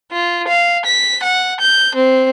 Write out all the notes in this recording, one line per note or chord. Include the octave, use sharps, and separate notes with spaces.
F4
F5
B6
F#5
G6
C4